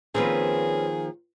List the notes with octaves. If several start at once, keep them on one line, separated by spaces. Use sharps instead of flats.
D#3 F3 A#3 C4 C#4 G#4 B4